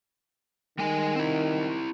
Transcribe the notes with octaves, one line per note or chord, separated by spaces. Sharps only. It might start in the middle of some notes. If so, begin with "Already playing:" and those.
D#3 G3 G#3 G#5
C4 E4